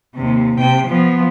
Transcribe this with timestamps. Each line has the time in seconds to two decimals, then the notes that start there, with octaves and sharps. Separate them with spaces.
0.16 D#2 C3
0.57 C3 G5
0.87 F3 B3